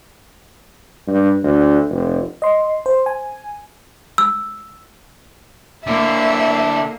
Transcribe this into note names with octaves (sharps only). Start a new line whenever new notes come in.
G2
D2
F1
D#5 C6
C5
G#5
E6
D3 A#3 E4 E5